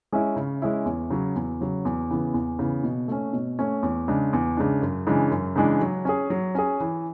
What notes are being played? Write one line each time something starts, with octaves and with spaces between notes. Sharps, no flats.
G#3 C#4 E4
C#3
G#3 C#4 E4
E2
C#3 F#3
E2
C#3 F#3
E2
C#3 E3 B3
E2
C#3 E3 B3
B2
A3 C#4
B2
A3 C#4
E2
C#3 G#3 D4
E2
C#3 G#3 D4
F#2
C#3 E3 G#3 D4
F#2
C#3 E3 G#3 D4
F#3
C#4 G#4
F#3
C#4 G#4
E3